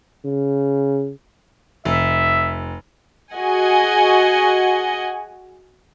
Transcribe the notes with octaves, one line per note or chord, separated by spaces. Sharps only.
C#3
F1 E5
F#4 G#4 D#5 F#5 G#5